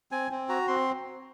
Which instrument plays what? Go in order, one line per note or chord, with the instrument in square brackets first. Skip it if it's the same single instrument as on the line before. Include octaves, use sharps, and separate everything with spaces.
[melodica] C4 G#5
C4
F#4 A#5
C4 C6